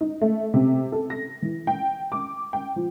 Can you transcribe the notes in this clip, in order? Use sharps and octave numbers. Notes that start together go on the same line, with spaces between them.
D#4
A3
C3
A4
A#6
E3
G5
D6
G5
F3